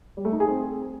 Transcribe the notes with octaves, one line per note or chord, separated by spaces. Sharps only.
G3
A3
D#4
G#4
C4